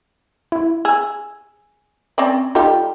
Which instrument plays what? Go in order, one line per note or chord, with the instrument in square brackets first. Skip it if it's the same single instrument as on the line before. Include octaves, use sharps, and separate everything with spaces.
[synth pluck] E4
[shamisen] G#4 [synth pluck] E6
[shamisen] C4 C#4 D5
[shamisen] G3 G4 [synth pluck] D#4 F4 A4